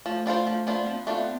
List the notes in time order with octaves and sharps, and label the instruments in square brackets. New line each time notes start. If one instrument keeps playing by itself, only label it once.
[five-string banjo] F3 [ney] A3
[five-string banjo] B3 D4 F4 C5
F3
B3 D4 F4 C5
[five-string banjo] F3 [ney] C#4
[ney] B3
[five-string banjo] A3 D4 F4 C5